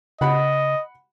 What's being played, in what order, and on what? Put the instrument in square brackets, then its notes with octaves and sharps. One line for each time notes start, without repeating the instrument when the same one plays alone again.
[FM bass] C#3 [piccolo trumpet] D#5 [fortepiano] F#5 B5